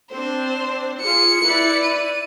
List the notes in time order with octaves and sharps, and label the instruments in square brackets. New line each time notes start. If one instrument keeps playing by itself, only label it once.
[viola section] C4 D4 [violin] C5
[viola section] F4 G#4 [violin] C#7
[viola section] E4 B4 D5
[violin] D#7